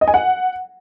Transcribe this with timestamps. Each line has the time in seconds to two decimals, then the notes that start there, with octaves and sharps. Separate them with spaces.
0.01 D#5
0.08 G#5
0.14 F#5